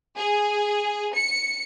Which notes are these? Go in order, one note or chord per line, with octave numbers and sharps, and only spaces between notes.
G#4
C#7